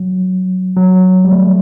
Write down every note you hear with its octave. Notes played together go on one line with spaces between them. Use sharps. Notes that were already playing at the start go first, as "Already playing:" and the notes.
Already playing: F#3
F#3
G3
A3